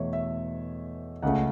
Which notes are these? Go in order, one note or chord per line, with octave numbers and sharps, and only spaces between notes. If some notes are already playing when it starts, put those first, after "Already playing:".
Already playing: E2 B2 A3 C#5 E5
E5
C#2 C#3 A3 F#5